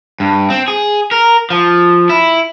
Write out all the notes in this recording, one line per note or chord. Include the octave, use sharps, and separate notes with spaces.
G2
C4
G#4
A#4
F3
E4